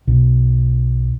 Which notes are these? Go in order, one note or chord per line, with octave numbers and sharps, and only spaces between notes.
B1